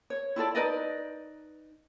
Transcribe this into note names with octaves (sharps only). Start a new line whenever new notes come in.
C#5
E4 F4 A4 D5
D#4 B4 D5 D#5